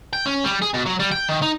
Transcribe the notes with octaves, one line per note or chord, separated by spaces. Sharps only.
G5
C#4
G3
G#4
B2
F#3
G3
G5
D#3
D#4